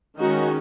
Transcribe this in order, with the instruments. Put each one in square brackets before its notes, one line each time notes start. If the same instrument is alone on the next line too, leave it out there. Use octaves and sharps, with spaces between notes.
[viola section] D#3 G#3 C#4 D#4 F#4